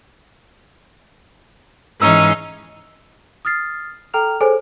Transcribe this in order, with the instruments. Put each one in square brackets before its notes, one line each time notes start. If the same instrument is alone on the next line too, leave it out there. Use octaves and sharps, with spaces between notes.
[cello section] G#2 E3 [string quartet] C#4 D#4 G#4 [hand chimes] E6
[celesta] D#6 F6 A6 C7
A4 G5 A#5 F6 F7
G#4 A4 C5 C#5 G#5